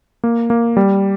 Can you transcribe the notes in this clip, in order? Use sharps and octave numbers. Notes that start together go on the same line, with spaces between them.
A#3
A#3
G3